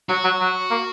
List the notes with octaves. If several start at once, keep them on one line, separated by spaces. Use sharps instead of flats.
F#3 F#4
F#3
F#3
A#3